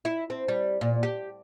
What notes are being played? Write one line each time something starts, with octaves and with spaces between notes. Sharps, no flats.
E4
C4
G3
A#2
G4